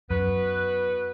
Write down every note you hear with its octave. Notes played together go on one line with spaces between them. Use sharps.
F#2 B3 F#4 B4